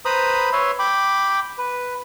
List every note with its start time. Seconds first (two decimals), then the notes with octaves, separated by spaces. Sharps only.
0.05 B4 C5 A#5 B5 D#6
0.53 B4 C#5 E5 C6
0.79 G5 B5 D6
1.58 B4